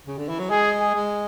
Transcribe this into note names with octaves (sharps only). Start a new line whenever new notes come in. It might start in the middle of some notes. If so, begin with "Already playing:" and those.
C#3
D3
E3
F#3
G#3 G#4
G#4
G#3